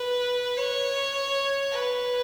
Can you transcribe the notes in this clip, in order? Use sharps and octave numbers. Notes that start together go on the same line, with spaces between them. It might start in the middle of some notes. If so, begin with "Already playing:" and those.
Already playing: B4
C#5
B4